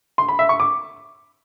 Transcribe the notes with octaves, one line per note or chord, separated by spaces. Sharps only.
C6
B5
E5
C#6
D6